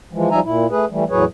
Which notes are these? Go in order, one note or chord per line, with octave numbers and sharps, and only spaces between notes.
E3 F3 G#3
F3 G3 D#4 E5 G#5 A#5
A#2 E4
A3 G#4 B4
E3 G3 A3
E2 A2 F#3 G#4 B4 C#5